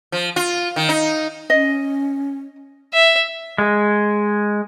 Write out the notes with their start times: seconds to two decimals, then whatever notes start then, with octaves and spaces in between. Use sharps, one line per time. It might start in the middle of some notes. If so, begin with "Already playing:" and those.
0.12 F3
0.36 F4
0.76 D#3
0.89 D#4
1.50 C#4 D#5
2.94 E5
3.58 G#3